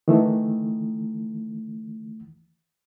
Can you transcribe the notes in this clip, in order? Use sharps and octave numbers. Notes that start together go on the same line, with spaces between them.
D#3 E3 A3